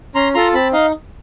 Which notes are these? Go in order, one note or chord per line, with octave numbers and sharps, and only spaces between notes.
C#4 A#5 C6
F4 A4 A#5 C6
C4 A5 B5
D#4 D#5 F5